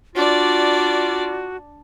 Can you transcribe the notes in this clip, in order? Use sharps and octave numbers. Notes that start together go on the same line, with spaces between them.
D4 F4 F#4 D5